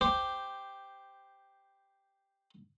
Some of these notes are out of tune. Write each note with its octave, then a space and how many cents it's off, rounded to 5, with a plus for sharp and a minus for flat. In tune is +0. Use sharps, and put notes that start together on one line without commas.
G4 +0 C5 -10